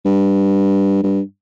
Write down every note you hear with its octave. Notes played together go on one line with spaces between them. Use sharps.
G2
G2